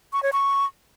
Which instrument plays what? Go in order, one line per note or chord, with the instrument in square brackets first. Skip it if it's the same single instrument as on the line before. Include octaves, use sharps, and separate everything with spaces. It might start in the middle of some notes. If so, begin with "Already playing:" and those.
[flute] C#6
C#5
C#6